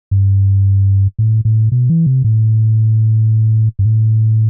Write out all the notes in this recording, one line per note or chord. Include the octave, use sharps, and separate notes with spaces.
G2
A2
A2
B2
E3
C3
A2
G2
A2